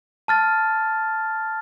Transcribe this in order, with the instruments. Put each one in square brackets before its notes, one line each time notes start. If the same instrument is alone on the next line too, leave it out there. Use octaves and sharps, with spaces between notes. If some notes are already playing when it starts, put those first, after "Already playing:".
[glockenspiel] A5 F6 A6